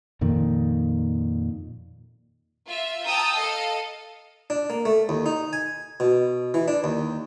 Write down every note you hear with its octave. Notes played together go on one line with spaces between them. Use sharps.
F2 A#2 D#3
F4 E5
G5 A5 A#5 D#6 E6 G6
A4 D#5 F5
D4
A#3
A3
D#2
D#4
G#5
B2
E3
D4
D#2